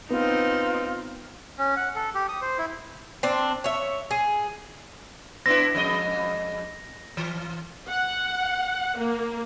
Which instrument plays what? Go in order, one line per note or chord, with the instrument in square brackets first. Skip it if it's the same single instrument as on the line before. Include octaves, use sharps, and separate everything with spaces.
[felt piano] B3 [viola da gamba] C4 D#4 [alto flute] F4
[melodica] C#4
F#5
A4
G4
D#6
C5
E4
[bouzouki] C4 D4
C#5 E5
G#4
[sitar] B3 D4 E4 [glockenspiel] A#6
[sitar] F2 G#3 D#5
E3
[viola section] F#5
A#3